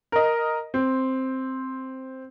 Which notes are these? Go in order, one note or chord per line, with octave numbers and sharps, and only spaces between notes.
A#4 D#5
C4